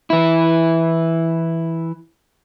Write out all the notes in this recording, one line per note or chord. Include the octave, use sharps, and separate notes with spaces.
E3 E4